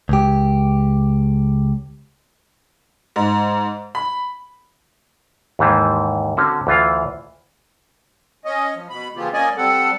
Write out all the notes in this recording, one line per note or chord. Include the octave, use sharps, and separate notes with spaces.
C#2 G4
G#2
B5
D#2 G#2 E3 G3
D3 C4 C#4 F#4
D2 E3 F4 F5
C#4 D#5
F3
B2 B5
C#3 E3 F3 A#3 F4 G4
A#3 C#4 D5 D#5 G#5
G3 C4 A4 F#5